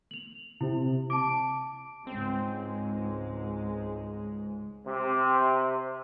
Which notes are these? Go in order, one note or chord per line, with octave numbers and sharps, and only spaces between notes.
F7 F#7
C3 E4
A5 D6 D7
C#2 G#2 G#3 C4
C3